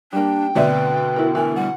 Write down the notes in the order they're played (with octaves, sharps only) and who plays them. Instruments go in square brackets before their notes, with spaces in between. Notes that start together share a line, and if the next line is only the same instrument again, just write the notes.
[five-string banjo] G3 A#3 [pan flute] D4 [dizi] G5
[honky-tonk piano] D2 B2 D3 [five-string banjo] C4 D5 E5 [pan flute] B4
[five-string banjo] E4 A#4
[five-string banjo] E3 [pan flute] A#4
[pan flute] G3 [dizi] F#5